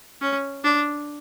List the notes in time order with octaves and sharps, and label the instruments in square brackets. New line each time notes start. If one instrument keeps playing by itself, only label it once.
[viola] C#4
D4